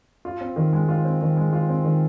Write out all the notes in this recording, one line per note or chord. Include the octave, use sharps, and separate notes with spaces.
F4
C4
D#3
G#3
F4
C4
D#3
G#3
F4
C4
D#3